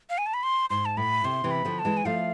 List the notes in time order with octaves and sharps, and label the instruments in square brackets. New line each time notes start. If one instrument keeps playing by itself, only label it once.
[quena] F5
G#5
A5
B5
C6
[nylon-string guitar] G#2 [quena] C6
[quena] A5
[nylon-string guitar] A2 [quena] B5
[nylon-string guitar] C3 [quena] C6
[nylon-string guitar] C3 E3
[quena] B5
[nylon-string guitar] D3 F3
[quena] A5
[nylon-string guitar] E3 G#3
[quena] G#5
[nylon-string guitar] F3 A3 [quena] F5